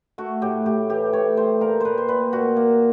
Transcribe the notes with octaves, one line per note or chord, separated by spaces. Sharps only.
A3 F#4
A2 G4
A2 G4
E3 G4
A2 C#5
A3 C5
A#2 A#4
A#2 B4 C5
C5
A#2 B4
A#2 F#4
A#3